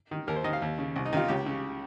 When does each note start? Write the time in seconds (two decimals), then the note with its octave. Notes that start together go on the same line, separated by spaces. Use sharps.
0.11 D#3
0.28 D#2 A#4
0.36 C5
0.44 D#3 D#5
0.53 F5
0.62 D#2
0.78 C#3
0.96 C2
1.05 D#4
1.13 C3 D#3 F4
1.28 C#2 G4
1.46 C#3